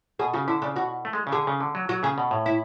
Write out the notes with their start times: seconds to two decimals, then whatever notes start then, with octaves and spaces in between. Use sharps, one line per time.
0.19 B2 G#4
0.33 C#3 F#4
0.48 D3 E4
0.62 C#3 D4
0.76 B2 F#4
1.05 A3
1.13 G#3
1.27 C#3
1.32 D3 G#4
1.47 C#3
1.60 D3
1.75 F#3
1.89 F#3 F#4
2.03 C#3 G#4
2.18 B2
2.31 A2
2.46 E4